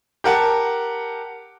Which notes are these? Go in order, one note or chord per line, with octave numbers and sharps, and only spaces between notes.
G4 A#4 F#5 A5